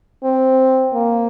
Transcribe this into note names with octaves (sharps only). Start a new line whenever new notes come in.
C4
A#3